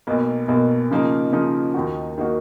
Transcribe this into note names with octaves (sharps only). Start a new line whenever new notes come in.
B1 B2 A#3
B1 B2 A#3
C#3 F3 A#3 D#4 A#4
C#3 F3 A#3 D#4 A#4
D#2 D#3 A#3 D#4 F#4
D#3 A#3 D#4 F#4